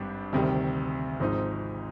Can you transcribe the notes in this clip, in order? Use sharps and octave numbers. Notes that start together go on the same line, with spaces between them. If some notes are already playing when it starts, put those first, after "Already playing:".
Already playing: G#1 G2 D#3 G3 D4
D2 C3 D#3 G3
G#1 G#2 F3 C4 D#4